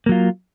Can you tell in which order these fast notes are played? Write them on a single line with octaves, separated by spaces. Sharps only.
A#3 F#3 F4